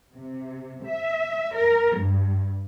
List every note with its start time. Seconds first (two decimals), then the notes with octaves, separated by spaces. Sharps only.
0.14 C3
0.85 E5
1.55 A#4
1.96 G2